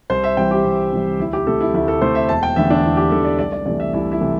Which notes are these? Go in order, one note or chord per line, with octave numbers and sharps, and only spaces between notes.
C2 C5
E5
C3 E3 G3 G5
G4
C2
C3 E3 G3
D2 E4
G4
C3 A3 A4
E4
D2 E4
A4
C3 A3 C5
E5
E1 A5
G5
E2 D3 A3 E5
D4
E1 E4
G4
E2 D3 A3 A4
D5
C2 D5
D5
C3 E3 A3 D5
E5
C2 E4
E4
C3 E3 A3